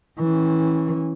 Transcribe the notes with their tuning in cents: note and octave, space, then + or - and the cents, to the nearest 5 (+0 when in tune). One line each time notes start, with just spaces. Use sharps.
E3 -20 C#4 -20